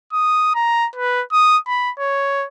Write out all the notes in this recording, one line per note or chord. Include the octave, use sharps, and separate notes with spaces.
D#6
A#5
B4
D#6
B5
C#5